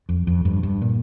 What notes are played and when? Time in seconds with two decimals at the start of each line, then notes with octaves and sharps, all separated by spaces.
0.09 F2
0.27 F2
0.45 G2
0.63 G2
0.81 A#2